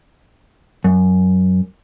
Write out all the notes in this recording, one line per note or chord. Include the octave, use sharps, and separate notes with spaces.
F#2